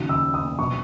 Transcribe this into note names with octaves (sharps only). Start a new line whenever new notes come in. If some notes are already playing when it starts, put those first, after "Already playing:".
Already playing: D#2 C#3 F#3
E6
D#6
B2 F#3 C#6